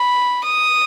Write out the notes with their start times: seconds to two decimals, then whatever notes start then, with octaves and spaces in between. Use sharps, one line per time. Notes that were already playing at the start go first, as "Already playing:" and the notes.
Already playing: B5
0.44 D#6